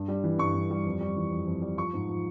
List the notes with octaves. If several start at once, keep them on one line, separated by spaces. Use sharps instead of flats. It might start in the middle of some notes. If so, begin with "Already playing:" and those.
Already playing: G2
G3
E3
G2 C#6
G2
G3
F2
G3
E3
F2
F2
G3
F3 C#6
G#2
F3